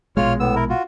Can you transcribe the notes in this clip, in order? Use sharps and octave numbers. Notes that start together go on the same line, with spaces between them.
A#1 B2 G#3 F4 C#5 F6
A2 B3 E6
E4 A#4
F4 F#4